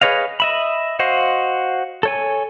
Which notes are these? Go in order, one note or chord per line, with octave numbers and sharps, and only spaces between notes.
G#4 B4 C#5 D#5 F5
D#5 E5 B5
F#4 C5 D#5 F5
A4 C#5 G#5